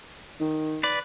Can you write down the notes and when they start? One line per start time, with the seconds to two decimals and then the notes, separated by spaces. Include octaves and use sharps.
0.40 D#3
0.83 B4 D5